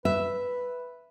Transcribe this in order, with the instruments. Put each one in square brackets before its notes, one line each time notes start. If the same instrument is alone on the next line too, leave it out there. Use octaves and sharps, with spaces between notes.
[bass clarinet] B4 [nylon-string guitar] E5